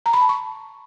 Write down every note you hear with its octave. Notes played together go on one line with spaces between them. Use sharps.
A#5
B5
A5
C#6